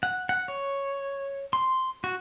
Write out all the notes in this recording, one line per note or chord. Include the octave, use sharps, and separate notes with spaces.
F#5
F#5
C#5
C6
F#4